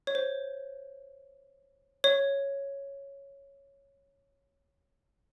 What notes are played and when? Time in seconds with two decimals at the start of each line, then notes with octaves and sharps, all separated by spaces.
0.07 C#5
0.15 C5
2.04 C#5